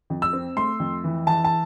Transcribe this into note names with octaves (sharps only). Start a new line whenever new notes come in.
F2
E6
C4
A3 C6
F2
E3
E3 A5
A5